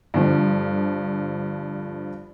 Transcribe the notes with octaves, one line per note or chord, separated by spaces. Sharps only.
G2 D3 F3